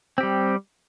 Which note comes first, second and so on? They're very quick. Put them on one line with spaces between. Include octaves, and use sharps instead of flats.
C4 G4 G3